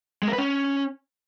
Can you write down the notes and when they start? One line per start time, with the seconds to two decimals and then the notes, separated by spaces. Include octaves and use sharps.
0.23 G#3
0.28 A#4
0.33 B4
0.38 C#4